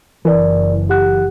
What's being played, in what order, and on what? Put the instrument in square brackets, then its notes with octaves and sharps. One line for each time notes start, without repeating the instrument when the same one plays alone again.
[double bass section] F#1 [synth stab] E3 [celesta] A#4 D5
[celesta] G4 F#5 F#6